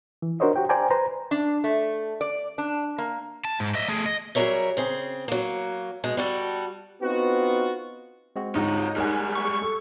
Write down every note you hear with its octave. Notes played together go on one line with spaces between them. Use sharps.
E3
D4 F#4 A#4 C5 C#5 D#5
F#4 G4 G5
C5 D5 G5 G#5 A#5
B4 C5 A#5
D4
A3
D5
D4
A#3
A5
G#2
D#5 E5
A3 G#4
D#5
F#3 G3 G#4 A#4 C#5 E5
C#3 C4 G#4
F#3 A#3
B2 G#3
G3 F#4 A4
B3 C4 D#4 F4 F#4
G#3 C4 F#4
D2 G#2 D#4 F4 C#5
G3 G#3 A#4 C#5 F#5 G#5 F#6
C#6
A4